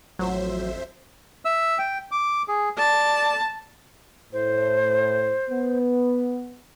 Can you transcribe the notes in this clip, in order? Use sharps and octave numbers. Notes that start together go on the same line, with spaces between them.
A1 F2 F#3 C5 E5
E5 E6
G5
D6
G#4
D5 A5
A2 C5
B3